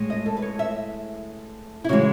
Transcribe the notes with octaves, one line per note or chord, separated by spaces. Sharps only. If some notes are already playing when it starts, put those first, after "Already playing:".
Already playing: A2 G#3
D#5
A4
B4
C#5
E5
E4
C#3 E3 G#3 F#4